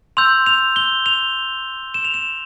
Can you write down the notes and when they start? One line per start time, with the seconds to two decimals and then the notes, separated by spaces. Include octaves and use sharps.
0.17 C6 E6 G6 F7
0.46 F7
0.76 G7
1.06 F7
1.94 E7
2.05 F7
2.14 E7